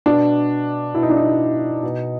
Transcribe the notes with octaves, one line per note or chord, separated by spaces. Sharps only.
B2 D4
B2 E4
D#4
D4
D#4
B2